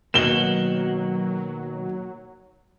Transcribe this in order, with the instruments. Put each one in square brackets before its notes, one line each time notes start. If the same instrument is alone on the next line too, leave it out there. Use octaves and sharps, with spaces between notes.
[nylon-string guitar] B2 D#3 [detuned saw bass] F#3 [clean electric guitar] A#3 F#4 [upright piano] E7 G7